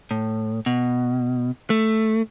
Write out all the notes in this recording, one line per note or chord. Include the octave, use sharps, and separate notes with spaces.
A2
B2
A3